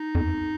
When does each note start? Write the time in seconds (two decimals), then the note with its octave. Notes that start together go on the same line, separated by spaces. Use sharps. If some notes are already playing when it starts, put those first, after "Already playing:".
Already playing: D#4
0.15 F2